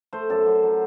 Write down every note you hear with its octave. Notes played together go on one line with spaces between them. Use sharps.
A3 C5
F#2 A4
F#2
F#3